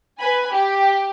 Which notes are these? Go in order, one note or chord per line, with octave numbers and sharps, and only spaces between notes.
B4 G#5 B5
G4